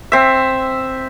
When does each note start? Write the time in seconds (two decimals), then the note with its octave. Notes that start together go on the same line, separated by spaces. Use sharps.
0.12 C4 E5